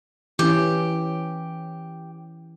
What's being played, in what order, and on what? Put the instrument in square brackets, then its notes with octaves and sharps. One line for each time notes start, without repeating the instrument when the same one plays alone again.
[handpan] E3 C#4 [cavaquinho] G4